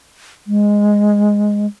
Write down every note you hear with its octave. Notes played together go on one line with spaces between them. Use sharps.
G#3